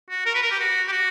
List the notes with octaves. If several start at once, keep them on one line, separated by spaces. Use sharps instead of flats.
F#4
A#4
B4
A#4
G4
F#4
G4
F#4